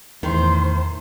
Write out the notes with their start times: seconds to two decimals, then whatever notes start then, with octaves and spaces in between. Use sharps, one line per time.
0.23 E2 A2 D#3 C5